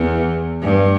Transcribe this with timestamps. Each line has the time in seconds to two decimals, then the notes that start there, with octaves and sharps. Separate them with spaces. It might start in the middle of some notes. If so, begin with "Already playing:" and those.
Already playing: E2
0.62 G2